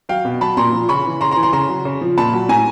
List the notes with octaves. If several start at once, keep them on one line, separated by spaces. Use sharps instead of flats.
F#3 F5 G5
B2
F#3 A5 B5
A#2 A#5 C6
F3
C#3 B5 C#6
E3
C#3 A#5 C6
A#5 C6
E3
A#5 C6
C#3 A#5 C6
F#3
C#3
F3
A#2 A5 B5
F#3
A2 G#5 A#5